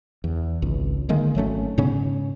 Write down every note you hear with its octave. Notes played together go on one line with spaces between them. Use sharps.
E2
G#1 C#2
D3 D#3 G#3 A#3
G#1 F#3 A3 C#4
G#2 C#3 B3 C#4